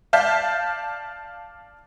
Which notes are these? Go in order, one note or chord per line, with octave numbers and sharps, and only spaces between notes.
D5 F5 A5 G6 B6